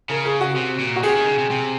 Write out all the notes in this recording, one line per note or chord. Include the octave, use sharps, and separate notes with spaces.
C#3 A#4
G#4
F#4
C3
A#2
F#4
C3 G#4
D#3
C#3
C3
C3